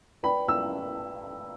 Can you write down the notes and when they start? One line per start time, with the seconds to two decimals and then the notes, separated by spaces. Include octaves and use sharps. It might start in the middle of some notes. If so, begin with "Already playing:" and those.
0.23 B4 D5 G5 B5
0.48 E6